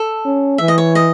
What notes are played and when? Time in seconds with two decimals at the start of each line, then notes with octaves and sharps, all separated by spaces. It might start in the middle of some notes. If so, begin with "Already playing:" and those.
Already playing: A4
0.25 C#4
0.58 E3 E5
0.68 D#5
0.78 C#5
0.95 D#5